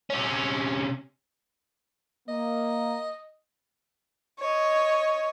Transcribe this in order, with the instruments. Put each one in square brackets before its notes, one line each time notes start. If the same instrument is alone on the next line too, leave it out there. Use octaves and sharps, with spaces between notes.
[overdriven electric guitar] C3 C#4
[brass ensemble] A#3 [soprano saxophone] D#5
[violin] C#5 D#5